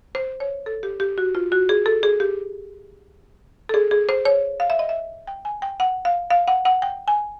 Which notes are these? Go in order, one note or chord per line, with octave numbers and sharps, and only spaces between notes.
C5
C#5
A4
G4
G4
F#4
F4
F#4
G#4
A4
G#4
G4
A4
G#4
G#4
C5
C#5
F5
E5
D#5
E5
G5
G#5
G5
F#5
F5
F5
F#5
F#5
G5
G#5